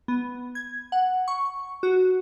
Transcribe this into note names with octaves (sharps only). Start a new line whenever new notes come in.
B3
G#6
F#5
C#6
F#4